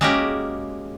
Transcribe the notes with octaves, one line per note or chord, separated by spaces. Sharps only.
G#3 A#3 C#4 F#4 G4 A#4